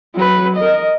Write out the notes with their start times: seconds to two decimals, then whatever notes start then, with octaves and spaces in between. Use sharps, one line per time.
0.15 F#3 B4
0.56 A#4 D#5